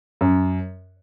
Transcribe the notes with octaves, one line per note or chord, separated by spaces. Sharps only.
F#2